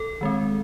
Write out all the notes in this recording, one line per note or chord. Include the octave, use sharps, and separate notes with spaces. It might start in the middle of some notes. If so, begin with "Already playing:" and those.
Already playing: A4
D#3 G#3 C4